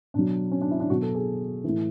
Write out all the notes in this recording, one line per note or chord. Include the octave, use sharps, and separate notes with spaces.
B2 F#3 D4
C#4
D4
E4
D4
B2 F#3 F#4
A4
G#4
A2 E3